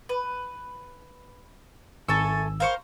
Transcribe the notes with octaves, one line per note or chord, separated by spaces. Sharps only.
B4
G#1 A4 E5 G#5 C#6 E6
A#4 C5 F5 C#6